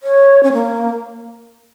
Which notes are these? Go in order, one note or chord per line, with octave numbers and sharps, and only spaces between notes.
C#5
C#4
A#3